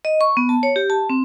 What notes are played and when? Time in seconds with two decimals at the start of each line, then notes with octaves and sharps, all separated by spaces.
0.05 D#5
0.21 C#6
0.37 B3
0.49 A5
0.63 C#5
0.76 G4
0.90 A5
1.10 C4